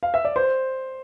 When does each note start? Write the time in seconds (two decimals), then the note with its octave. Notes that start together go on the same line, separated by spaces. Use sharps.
0.03 F5
0.14 E5
0.25 D5
0.36 C5